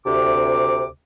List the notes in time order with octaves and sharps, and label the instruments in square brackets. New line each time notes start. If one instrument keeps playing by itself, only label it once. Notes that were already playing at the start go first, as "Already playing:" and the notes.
[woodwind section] D2 C3 D6